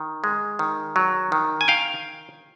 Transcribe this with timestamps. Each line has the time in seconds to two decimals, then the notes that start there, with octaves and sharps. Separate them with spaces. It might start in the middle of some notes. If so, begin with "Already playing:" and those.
Already playing: D#3
0.24 G#3
0.59 D#3
0.96 F#3
1.32 D#3
1.61 G#5
1.68 D#3 F5 G5